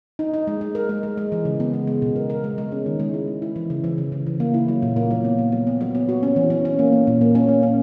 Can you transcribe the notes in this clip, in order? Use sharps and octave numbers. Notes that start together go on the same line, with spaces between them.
D#4
D#4
G#3
G#3
A#4
G#3
G#3
G#3
E3
C#3
B3
G#3
G#3
B2
A#4
A#4
G#3
G#3
C#4
D#3
G#3
E4
G#3
E4
E3
C#3
E3
C#3
C#3
E3
A#3
E4
F#3
A#2
A#3
F#3
B3
F#3
F#3
B3
F#3
B3
F#4
C#4
E3
C#4
C#4
A#3
A#3
A#2
A#3
C#4
A#3
C#4